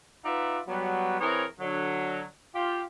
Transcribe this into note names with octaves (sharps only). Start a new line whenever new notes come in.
D#4 F4 B4 D5 E5 F#5
F#3 G3 B3
E3 C4 E4 G#4 A#4 C#5
D3 F#3
F4 G4